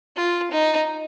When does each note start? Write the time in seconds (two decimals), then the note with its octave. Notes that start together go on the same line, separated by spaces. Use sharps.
0.16 F4
0.52 D#4